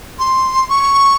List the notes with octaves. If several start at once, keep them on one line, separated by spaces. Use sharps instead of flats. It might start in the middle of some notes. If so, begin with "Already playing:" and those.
C6
C#6